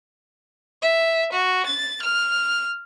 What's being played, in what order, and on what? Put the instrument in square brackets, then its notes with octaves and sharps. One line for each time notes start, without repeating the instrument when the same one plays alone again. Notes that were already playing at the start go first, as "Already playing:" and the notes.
[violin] E5
F#4
A6
F6